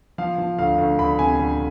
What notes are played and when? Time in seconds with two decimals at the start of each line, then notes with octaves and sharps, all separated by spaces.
0.18 F3 F5
0.38 F3
0.59 D2 F5
0.78 D2
0.98 D2 B5
1.19 C3 G#5
1.40 D2